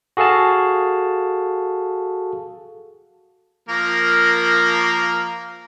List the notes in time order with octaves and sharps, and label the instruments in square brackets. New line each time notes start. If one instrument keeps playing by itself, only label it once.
[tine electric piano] F#4 G#4 A4 F5 A5
[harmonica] F3 A#3 A#4